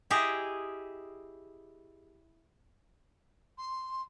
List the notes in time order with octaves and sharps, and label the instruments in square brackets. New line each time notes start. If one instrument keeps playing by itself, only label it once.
[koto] E4 G4 G#4 D#5
[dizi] C6